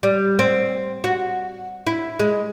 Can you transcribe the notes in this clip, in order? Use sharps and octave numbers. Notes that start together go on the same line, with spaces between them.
G3
C4
F#4
E4
G#3